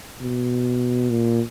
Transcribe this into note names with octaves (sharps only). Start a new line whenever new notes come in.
B2
A#2